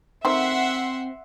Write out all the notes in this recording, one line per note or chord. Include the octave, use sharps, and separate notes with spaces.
D#3 A3 C4 C5 E5 F#5 C6